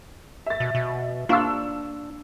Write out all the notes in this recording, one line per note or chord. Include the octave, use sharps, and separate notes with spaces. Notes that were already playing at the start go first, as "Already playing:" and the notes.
E5 A6
B2
B2
A#3 D4 F4 C#6 E6